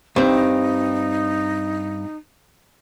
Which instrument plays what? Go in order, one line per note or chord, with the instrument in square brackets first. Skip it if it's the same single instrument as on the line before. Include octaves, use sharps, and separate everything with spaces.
[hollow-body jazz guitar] G2 C4 [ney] D#4